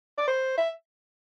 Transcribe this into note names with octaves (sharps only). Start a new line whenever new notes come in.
D5
C5
E5